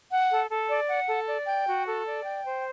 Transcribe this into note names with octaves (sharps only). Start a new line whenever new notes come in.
F#5
A4
A4
D5
F#5
A4
D5
G5
F#4
A4
D5
G5
C5